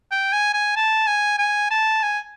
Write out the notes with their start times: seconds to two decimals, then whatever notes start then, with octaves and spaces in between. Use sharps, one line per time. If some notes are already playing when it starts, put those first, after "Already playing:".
0.12 G5
0.33 G#5
0.54 G#5
0.76 A5
1.07 G#5
1.38 G#5
1.71 A5
2.03 G#5